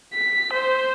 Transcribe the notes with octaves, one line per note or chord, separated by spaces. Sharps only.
B6
C5